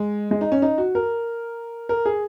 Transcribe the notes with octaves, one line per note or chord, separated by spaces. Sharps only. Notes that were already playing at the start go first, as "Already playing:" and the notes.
Already playing: G#3
G#3
D#4
C#4
D#4
F#4
A#4
A#4
G#4